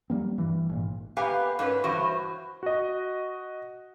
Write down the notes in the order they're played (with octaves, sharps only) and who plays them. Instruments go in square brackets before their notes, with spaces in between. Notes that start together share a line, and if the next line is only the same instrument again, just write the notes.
[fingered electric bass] F#3 G3 A#3 C4
G2 E3
G#1 A#2
[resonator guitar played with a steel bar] A#3 B3 G4 B4 F5 G#5
G#2 C#4 G#4 B4
G2 E3 F#3 F#4 C5
[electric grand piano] F#4 D#5